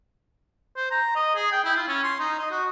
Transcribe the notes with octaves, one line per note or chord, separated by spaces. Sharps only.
C5
A#5
D#5
G#4
G5
E4
F4
C#4
C6
D#4
D#5
F#4